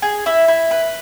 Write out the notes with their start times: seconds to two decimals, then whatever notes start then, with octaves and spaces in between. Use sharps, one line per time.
0.02 G#4
0.26 E4
0.48 E4
0.71 B4